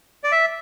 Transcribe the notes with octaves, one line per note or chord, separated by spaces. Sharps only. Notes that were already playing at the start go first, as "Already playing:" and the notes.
D5
E5